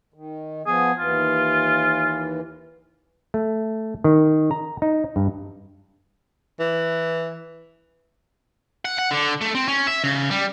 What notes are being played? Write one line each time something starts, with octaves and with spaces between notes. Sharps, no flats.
D#3
F3 B3 G#4
D#2 E3 F4
A3
D#3
A#5
D#4
G2
E3
F#5
F#5
D3
A3
C4
C#4
E5
C#3
G3